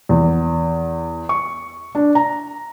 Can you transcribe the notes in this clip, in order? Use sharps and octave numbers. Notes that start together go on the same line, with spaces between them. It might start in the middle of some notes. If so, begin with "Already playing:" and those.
E2
C#6
D4
A#5